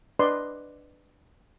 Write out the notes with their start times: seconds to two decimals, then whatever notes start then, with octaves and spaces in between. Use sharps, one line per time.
0.19 D4 B4 D5 D#5 C6